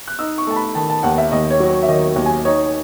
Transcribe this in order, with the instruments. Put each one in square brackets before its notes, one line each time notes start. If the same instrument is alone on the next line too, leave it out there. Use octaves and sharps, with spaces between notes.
[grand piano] F#6
D#4 E6
C#6
A3 A5
B5
D#3 A5
A5
D#2 F#5
E5
D#2 D#5
C#5
F#3
C#5
E5
D#3 D#5
D#2
G#5
D#4 C#5